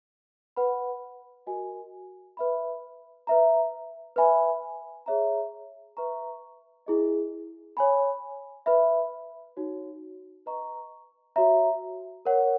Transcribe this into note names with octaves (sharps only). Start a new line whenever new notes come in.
B4 F#5 B5
F#4 A#4 D#5 G#5
B4 E5 B5
B4 E5 A#5
B4 E5 G#5 B5
G#4 C#5 E5 A#5
B4 E5 A#5 C#6
E4 G#4 D#5
C#5 G#5 B5
B4 E5 B5
D#4 F#4 C#5
B4 D#5 A#5 C#6
F#4 C#5 E5 A#5
A#4 C#5 F#5